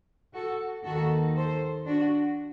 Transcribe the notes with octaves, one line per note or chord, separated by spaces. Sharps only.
F#4 A4
D#2 D#3 F#4 A4
A4 C5
D4 F#4